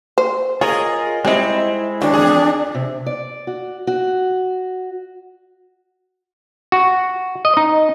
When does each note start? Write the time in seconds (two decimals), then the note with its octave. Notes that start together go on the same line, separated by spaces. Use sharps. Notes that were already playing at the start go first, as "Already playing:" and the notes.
0.18 C5
0.61 F4 G#4 A#4 C#5 D#5
1.25 G3 G#3 C4 D#4 E4
2.02 D#2 F#3 D4
2.13 E2 G#4
2.74 C3
3.06 D5
3.47 F#4
3.87 F#4
6.72 F#4
7.45 D#5
7.57 D#4